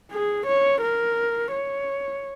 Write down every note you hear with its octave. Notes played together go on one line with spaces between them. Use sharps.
G#4
C#5
A#4
C#5